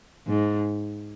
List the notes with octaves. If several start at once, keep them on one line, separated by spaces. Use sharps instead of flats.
G#2